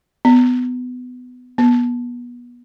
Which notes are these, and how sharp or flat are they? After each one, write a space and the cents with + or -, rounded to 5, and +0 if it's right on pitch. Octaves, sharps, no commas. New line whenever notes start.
B3 +20
B3 -30